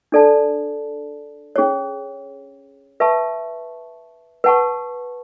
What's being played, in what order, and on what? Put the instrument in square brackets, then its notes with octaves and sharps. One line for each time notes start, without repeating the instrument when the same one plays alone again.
[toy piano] D4 A4 D5 A5
C#4 G#4 C#5
B4 E5 A5 C#6
B4 F#5 A5 C#6